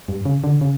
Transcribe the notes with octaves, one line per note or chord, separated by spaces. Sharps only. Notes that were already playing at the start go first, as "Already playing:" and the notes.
G2
C#3
D3
C#3